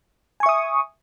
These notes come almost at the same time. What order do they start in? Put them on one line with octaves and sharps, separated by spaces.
G#5 C#6 E5 D#6